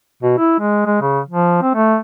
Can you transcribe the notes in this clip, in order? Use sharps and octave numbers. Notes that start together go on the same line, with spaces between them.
B2
E4
G#3
G#3
C#3
F3
C4
A3